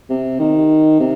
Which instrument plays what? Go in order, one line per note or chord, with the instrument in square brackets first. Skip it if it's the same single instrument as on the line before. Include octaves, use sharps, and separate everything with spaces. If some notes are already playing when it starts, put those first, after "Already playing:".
[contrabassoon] C3
D#3
C3